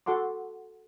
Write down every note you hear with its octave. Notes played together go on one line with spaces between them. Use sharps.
F#4 A4 F#5 C6 D6